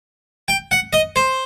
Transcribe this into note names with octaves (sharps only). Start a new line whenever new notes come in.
G5
F#5
D#5
C5